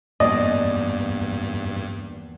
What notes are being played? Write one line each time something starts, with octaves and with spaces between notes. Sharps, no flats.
E2 G2 A#3 D5 D#5 A5